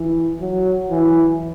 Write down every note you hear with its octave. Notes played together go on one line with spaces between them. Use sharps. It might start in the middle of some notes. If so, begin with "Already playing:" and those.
Already playing: E3
F#3
E3